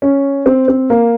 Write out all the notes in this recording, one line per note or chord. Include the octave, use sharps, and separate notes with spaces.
C#4
C4
C4
A#3